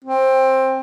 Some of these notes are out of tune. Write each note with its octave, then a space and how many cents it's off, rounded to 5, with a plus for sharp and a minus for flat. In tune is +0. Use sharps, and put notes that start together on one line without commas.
C4 +15